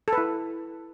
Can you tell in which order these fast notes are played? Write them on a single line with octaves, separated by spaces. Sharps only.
A4 B4 E4